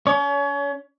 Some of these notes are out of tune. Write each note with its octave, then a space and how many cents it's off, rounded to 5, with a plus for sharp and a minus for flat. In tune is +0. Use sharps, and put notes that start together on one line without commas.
C#4 +40 C#5 +30